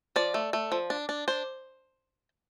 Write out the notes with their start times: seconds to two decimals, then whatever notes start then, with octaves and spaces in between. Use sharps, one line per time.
0.16 F3 D5
0.34 A3
0.53 A3
0.72 F3
0.90 D4
1.09 D4
1.28 D4 C5